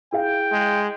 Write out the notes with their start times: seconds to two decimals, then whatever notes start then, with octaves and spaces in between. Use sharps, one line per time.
0.12 E4 G#4 F5 G5
0.52 G#3